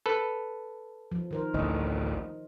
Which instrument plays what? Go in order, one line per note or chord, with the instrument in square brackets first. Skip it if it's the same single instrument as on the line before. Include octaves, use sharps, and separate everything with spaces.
[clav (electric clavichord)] A4 B4
[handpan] F3
D#3 A#4 C5
[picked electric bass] A1 D2 [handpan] D#5